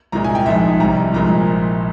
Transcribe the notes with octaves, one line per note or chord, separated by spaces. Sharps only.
C2 A#2 G#3 A#5
G#5
G5
A#1 G#2 F3 G#3 E5
C2 C3 G3 A#5
A#1 A#2 G#3 A#5